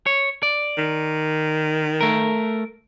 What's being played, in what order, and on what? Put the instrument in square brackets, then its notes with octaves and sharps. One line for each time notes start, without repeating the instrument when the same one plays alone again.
[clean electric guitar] C#5
D5
[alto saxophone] D#3
[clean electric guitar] A3 A#4